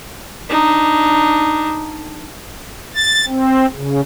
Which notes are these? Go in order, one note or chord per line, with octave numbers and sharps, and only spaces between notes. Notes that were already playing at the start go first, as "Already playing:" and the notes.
D4 D#4
A6
C4
C#3